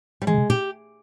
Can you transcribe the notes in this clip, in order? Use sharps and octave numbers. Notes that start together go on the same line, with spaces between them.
G3
E3 G#3
C#3
C3
A#2 G4